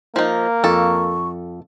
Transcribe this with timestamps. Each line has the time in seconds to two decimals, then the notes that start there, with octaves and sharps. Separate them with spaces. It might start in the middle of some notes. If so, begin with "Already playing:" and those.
0.16 F3 A#3 D#4
0.64 F2 A4 C#6